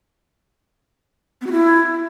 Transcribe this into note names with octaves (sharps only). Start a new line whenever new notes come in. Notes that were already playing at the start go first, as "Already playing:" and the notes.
B3
F#4
E4